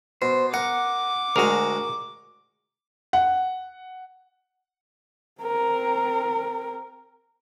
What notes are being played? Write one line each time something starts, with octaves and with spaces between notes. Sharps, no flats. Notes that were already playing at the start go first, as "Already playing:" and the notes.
B2 C5
A#4 F#5 D6
D2 G#3 F#4 G#4 A#4
F#5
C4 A#4